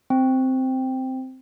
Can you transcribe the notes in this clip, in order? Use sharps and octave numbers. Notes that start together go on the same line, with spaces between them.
C4